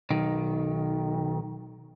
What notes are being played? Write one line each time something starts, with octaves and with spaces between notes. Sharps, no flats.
B1 D#3